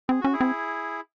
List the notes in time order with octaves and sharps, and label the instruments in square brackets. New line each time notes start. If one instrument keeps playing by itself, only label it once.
[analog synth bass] C4 [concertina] G#4
[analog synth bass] C#4 [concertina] F#4
[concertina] E4 G#4
[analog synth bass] C4